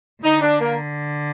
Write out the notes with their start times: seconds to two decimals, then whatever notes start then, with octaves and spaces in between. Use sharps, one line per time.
0.23 D3 D#4
0.42 D4
0.61 A#3